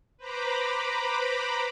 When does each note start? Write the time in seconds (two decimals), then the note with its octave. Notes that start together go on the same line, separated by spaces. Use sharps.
0.18 B4 C5 A#5 B5 D6